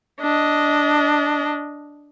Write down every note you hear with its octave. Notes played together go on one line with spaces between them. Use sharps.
D4 D#5